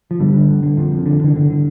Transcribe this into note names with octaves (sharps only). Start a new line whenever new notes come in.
F3
G2 D3 G3
D3
G1
D3
G1 F2 F3
F2
D3
D3 E3
G1 D3
D3